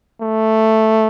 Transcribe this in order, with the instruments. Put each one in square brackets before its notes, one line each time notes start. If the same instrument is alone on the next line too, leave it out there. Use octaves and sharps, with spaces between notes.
[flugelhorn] A3